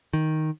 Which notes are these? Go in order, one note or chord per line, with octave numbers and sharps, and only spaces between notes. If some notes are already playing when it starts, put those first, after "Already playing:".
D#3